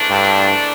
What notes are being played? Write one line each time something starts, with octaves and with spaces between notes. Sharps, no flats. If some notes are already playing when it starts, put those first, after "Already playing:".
Already playing: G#2 E3 A3 D4
G2